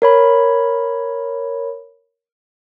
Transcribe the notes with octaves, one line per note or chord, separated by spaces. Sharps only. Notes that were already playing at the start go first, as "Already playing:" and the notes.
A#4 C#5 B5